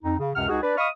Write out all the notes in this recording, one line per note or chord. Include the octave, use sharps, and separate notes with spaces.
F2 D#4
C#3
C#2 F#2 C3 F#5 F6
C#2 D#4 F#4 G#4
D4 B4 D5
D#5 F5 B5 C#6 D#6 F6